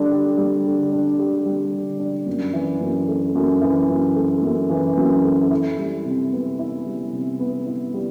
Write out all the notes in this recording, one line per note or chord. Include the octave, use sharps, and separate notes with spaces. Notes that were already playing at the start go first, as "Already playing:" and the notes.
Already playing: D3 G3 D4
G4
G3
D3
D4
G4
G3
D3
D4
F#2
E3
F#2
A3
F#2
E3
F#2
A3
F#2
E3
F#2
A3
E4
G3
C3
B3
E4
G3
C3
B3
E4
G3